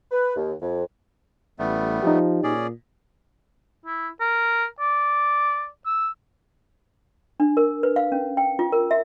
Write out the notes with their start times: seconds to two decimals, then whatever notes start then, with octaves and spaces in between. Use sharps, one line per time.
0.12 B4
0.36 D#2
0.61 F2
1.59 A1 G3 A3 B3
2.03 F3 D#4 G4
2.44 A#2 C#4 G#4 D5
3.86 E4
4.20 A#4
4.80 D5
5.86 E6
7.40 D4
7.57 A#4
7.83 B4
7.96 F5
8.12 C#4
8.37 G5
8.59 F4
8.72 A#4
8.91 E5